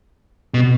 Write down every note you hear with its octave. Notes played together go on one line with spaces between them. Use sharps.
B2